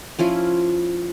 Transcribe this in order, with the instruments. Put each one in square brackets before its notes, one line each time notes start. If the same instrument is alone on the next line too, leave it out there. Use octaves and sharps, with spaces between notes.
[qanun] F3 C#4 E4 F4